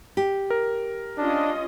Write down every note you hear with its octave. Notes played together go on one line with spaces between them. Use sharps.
G4
A#4
C#4 D4 F4 D#5